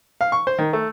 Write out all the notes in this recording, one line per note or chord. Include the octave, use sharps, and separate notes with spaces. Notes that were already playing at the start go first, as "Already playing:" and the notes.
F5
C#6
C5
D#3
A3